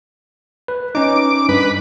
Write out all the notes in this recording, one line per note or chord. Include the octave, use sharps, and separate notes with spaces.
B4
C#4 D#4 D6
G2 B4